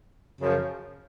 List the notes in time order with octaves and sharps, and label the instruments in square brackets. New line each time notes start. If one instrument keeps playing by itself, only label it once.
[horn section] F#2 C#3 F3